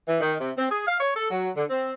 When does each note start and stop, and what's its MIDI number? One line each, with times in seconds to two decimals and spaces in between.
0.08 0.19 52
0.20 0.35 51
0.41 0.51 48
0.58 0.69 60
0.71 0.85 68
0.87 0.97 77
1.00 1.11 73
1.16 1.26 69
1.30 1.51 54
1.56 1.65 50
1.70 1.92 60